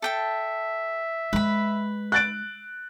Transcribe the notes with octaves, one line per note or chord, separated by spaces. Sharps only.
A4 E5 G5 A5
G#3 B4 B5
F#6 A6 D7